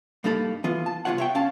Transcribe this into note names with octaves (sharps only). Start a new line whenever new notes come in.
G2 A#3 D#4 A4 B5
E3 B3 F4
A5
C2 B3 F4 C#5 F#5
C#5 E5 G5
C#4 F5 A5